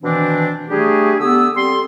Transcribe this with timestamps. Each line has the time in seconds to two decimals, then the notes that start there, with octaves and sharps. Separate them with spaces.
0.03 B2 D#3 E3 C4 D4
0.69 G3 A3 D4 G4 G#4
1.19 D3 B3 G4 D#6 E6
1.55 G3 C4 A4 C6